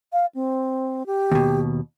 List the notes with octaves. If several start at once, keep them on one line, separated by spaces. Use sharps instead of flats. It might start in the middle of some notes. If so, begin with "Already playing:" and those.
F5
C4
G4
D#2 B2